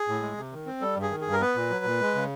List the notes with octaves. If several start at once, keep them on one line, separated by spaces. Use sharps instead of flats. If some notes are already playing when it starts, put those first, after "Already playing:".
Already playing: G#4
A2
G#3
C3
D#3
C4
G3 A4
G2
G#4
D#3
G#4
G2
A#4
B3 B4
A#2
F#3
A#2
G#3
C#3